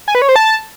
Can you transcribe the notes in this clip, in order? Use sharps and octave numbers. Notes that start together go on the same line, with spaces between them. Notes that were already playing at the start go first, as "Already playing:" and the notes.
G#5
B4
C#5
C5
A5